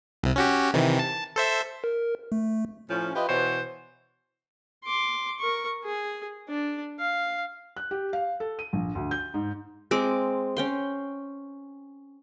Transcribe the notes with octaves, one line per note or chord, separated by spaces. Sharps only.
C2 C3
C#4 F#4 G4
C3 D#3 E3
A5
A4 C5 E5
A#4
A3
A2 F3 C#4
F4 G4 B4 D#5 E5
B2 E3 C5 C#5 F#5
C6 D6
A#4 C#6
G#4
D4
F5
F#6
G4
F5
A4
D#7
A#1
D2
G6
G#2
G#3 C4 D6
C#4 G5 C6